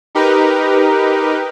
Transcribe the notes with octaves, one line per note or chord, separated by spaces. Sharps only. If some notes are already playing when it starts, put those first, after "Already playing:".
D#4 G4 A#4 B4